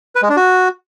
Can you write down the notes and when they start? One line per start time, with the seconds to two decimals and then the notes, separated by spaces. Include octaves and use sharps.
0.15 B4
0.22 G#3
0.30 D4
0.37 F#4